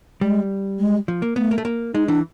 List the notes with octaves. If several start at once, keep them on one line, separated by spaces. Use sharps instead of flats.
G3 G#3
G#3
F3
A#3
A3 B3
A#3
A3
A#3
G#3 D#4
E3 D4